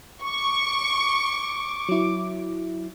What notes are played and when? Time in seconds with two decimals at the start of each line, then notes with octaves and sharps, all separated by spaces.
0.24 C#6 D6
1.89 F#3 E4